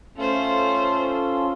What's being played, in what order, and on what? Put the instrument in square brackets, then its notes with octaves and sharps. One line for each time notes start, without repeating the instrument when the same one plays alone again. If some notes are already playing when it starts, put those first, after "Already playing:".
[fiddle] A3 C5 [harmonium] C#4 F4 A4